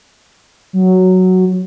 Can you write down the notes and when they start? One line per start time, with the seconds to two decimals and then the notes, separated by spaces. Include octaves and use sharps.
0.73 F#3